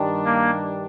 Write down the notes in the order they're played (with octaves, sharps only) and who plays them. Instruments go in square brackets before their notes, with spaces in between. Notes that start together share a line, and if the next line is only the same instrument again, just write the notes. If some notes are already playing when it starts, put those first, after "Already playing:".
Already playing: [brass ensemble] G2 D#3 G3 D4
[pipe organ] A#3